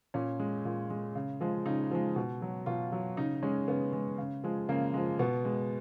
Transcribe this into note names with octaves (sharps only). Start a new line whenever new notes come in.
A#2 C#4
G#3
A#2
G#3
C#3
F3 G#3
C#3 D#4
F3 G#3
B2
F#3
B2 F4
F#3
C#3 D#4
G#3 C#4
C#3 B3
G#3
C#3
F3 G#3
C#3 A#3
F3 G#3
B2 B3
G#3